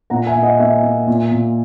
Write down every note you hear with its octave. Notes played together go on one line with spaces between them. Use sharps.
A#2 F#5 A#5
E5 G#5
A#2
D#5 F#5
A#3 E5 G#5
A#3
A#2
A#2